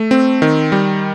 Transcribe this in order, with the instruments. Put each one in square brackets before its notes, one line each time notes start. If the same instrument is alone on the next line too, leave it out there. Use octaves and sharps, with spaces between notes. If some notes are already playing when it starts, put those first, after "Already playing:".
Already playing: [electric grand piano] A3
C4
D#3
G3